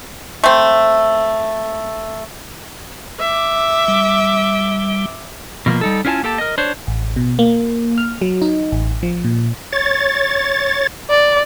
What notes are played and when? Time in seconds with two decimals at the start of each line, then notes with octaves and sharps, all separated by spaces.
0.44 A3 C4
3.20 E5 D6
3.88 G3
5.66 B2 F3 G#3 A#3
5.81 G3 D#4 A4
6.05 C#4 E4 F4 B4 G#5 A5
6.23 A#3 G4 A4 G5 A5
6.38 A#4 D#5
6.58 D4 C5 C#5
6.87 A1
7.16 B2
7.39 A#3
7.98 F6
8.21 F#3
8.42 D#4
8.72 A1
9.03 F3
9.24 A#2
9.73 C#5 A6
11.10 D5